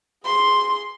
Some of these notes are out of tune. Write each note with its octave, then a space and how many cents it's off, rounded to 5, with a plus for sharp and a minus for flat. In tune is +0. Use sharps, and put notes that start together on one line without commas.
G#4 +0 C6 +0